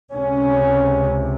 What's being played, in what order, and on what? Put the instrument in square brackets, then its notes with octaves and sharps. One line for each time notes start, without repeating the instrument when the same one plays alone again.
[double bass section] C#2 C3 C#4